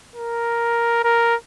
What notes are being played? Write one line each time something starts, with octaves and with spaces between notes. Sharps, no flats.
A#4
A#4